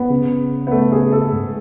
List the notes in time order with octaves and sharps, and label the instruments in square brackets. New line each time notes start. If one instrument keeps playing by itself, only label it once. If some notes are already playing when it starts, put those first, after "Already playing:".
Already playing: [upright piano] B3
[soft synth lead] C#3
[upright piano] B3
A3
G#4
A4
[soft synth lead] G#2